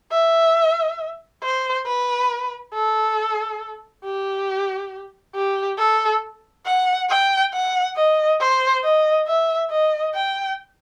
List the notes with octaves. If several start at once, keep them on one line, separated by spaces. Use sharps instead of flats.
E5
C5
B4
A4
G4
G4
A4
F#5
G5
F#5
D#5
C5
D#5
E5
D#5
G5